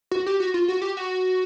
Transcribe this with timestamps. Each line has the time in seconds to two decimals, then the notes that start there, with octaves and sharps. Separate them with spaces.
0.11 F#4
0.26 G4
0.40 F#4
0.54 F4
0.68 F#4
0.82 G4
0.97 F#4